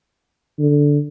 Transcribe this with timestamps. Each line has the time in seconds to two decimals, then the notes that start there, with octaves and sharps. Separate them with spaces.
0.59 D3